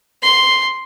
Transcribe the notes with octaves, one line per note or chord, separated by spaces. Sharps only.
C6